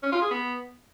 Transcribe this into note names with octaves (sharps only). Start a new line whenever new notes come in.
C#4
F4
G#4
B3